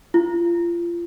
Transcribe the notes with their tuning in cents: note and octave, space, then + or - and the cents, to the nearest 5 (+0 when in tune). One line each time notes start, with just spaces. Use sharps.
F4 -30